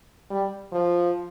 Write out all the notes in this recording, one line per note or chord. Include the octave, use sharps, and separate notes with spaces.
G3
F3